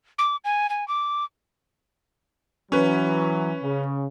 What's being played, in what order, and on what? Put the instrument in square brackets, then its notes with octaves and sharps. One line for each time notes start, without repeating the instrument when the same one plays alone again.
[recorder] D6
G#5
G#5
D6
[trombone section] E3 F#3 [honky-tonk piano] C#4 B4
[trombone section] C#3